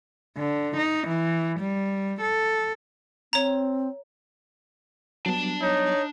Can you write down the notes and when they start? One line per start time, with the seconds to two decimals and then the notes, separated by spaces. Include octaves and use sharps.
0.38 D3
0.76 D#4
1.08 E3
1.60 G3
2.21 A4
3.33 C4 C#5 A#5
5.26 F#3 G3 B3 D4 A5
5.62 D#4 C#5